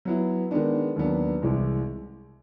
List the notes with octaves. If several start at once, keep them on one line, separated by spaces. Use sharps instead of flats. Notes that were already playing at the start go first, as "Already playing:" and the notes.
F#3 B3 E4
D#3 G#3 B3 D4
D#2 D#3 F#3 B3 D4
C2 C3 E3 G#3